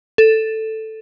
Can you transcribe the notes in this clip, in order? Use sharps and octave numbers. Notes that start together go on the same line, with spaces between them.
A4